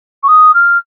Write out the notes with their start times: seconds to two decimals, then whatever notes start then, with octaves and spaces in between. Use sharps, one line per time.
0.23 C#6
0.28 D#6
0.54 F6